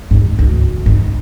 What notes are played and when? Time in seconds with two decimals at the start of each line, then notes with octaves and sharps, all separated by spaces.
0.11 G#2
0.39 D2
0.86 G#2